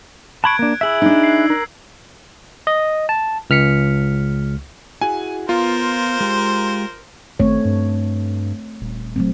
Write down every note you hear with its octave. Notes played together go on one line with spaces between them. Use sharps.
A5 B5 C#6 F#6 G#6 D7
A#3 D4
E4 G#4 E5 E6 F#7
D4 D#4
C7
A#4
D#5
A5
C#2 F6 B6 C#7
E4 F#4 G#4 G#5
B3 F4 A#4 C5
G#3 G4
G#1 A3 C4 C#5
G2
D#1
F#3 A3 C4